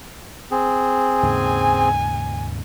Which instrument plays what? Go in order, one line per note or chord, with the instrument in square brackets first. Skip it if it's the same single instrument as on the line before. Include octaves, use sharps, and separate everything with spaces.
[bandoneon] C4 G#4
[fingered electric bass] D#2 G#2 C#3 [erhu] G#5